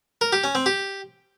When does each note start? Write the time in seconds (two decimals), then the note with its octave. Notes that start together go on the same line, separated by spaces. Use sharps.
0.21 A#4
0.33 G4
0.44 C#4
0.55 C4
0.66 G4